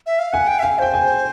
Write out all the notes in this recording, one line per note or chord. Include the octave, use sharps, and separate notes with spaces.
E5
F5
F#5 G#5
G5
E5
F5 G#5
C5 G5
G#5